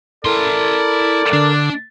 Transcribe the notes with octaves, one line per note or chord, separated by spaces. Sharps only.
E4 A4 A#4 D5 C6
D3 D4